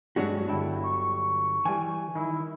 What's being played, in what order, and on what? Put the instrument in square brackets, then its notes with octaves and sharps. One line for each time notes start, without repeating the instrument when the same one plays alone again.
[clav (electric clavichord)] G2 G#3 C#5 [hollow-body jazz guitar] F#3 D4 F#4
[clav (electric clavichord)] G1 G5 A5 [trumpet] E4
[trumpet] C#6
[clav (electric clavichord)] E3 G3 [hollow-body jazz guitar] G#5
[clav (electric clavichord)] D#3 [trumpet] E4